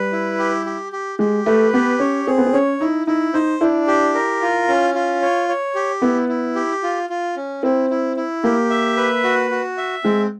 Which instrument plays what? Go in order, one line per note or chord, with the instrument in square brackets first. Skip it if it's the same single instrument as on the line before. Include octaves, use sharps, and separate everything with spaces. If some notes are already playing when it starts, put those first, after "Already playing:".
Already playing: [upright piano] G3 [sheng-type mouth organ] B4
[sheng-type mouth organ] E4
G4
G4
G4
[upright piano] G#3 [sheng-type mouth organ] G4
[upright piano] A3 [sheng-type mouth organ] B4
[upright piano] B3 [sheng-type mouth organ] G4
[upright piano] C#4 [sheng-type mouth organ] C#5
[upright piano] C4 [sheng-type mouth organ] G#4
[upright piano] B3
C4
[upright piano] C#4 [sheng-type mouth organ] C#5
[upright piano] D#4 [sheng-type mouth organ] E4
[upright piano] D#4 [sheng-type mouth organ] E4
[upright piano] D#4 [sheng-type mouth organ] C5
[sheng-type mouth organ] D4 [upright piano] E4
[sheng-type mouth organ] G4
A#4
F4
C#4
F4
C#5
C#5
G4
[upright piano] B3 [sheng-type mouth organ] E4
[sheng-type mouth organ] E4
G4
F4
F4
C#4
[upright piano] C4 [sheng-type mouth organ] E4
[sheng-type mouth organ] E4
E4
[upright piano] A#3 [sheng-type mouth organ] G4
[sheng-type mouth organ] E5
B4
F#4
F#4
E5
[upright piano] G#3 [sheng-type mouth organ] C4